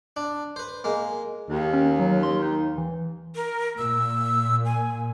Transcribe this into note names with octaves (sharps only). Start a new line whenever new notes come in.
D4
B4 C5
G#3 A#3
D#2
C#4
F#3
C6
D#4
E3
A#4
A#2 E6
G#5